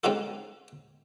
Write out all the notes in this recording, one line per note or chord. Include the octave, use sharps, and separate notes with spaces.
G#3 C4 C#4 D#4 F#4 A4